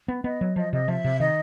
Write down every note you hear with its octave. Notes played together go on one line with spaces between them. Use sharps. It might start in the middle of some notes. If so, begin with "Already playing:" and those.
B3
B3 D#5
F#3
F3 D#5
C3 D#5
F3 E5
C3
D#3 D#5